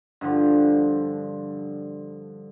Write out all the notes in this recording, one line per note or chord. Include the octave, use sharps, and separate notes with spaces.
G2 D3 F3